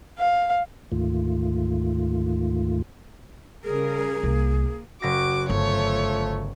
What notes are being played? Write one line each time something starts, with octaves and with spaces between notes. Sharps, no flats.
F5
D2 G#2 D#3 A3 F4
C#3 G3 G#4 A#4
C2 A#3
F#1 F#4 D6 A#6
G1 F3 A3 C#5